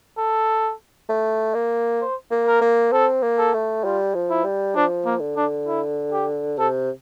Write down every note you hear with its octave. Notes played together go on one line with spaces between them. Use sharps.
A4
A3
A#3
C5
A#3
A#4
A#3
C4 A4
A#3
A4
A3
G3 F4
F3
E4
G3
F3 D4
A#3
D3
D4
E4
G4
C3 A4